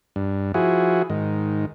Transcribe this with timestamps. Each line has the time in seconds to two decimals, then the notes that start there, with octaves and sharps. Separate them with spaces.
0.16 G2
0.54 F3 E4 F#4 G#4
1.10 G#2 D#3